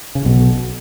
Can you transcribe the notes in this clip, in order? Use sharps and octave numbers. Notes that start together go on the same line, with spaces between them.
C#3
B1 B2